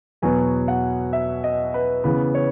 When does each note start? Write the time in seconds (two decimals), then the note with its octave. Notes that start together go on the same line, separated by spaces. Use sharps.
0.22 E2 B2 F#3 B3 G#5
0.68 F#5
1.13 E5
1.44 D#5
1.74 B4
2.04 C#3 E3 B3 B4
2.35 C#5